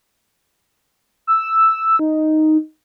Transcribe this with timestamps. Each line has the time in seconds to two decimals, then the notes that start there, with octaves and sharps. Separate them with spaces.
1.27 E6
1.99 D#4